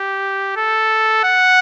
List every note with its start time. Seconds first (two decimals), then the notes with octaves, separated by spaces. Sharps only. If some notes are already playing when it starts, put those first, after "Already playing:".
Already playing: G4
0.56 A4
1.24 F#5